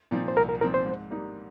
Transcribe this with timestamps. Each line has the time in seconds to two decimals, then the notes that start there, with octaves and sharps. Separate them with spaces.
0.11 A#2 F3 C4 D#4
0.28 C5
0.36 C2 A#4
0.49 A#4
0.61 A#2 F3 C4 D#4 A#4
0.74 C5
0.86 G#2
1.11 G3 A#3 D#4